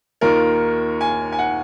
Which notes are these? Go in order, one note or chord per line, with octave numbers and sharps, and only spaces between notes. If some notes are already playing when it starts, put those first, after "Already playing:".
D#2 D#3 A#3 F4 A#4
G#5
G#5
F#5